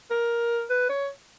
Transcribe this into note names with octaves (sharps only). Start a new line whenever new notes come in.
A#4
B4
C#5